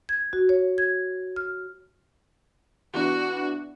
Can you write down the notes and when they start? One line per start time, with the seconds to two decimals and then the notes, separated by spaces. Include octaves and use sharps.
0.09 G#6
0.33 F#4
0.49 C#5
0.78 G#6
1.36 F6
2.94 E3 B3 D4 F#4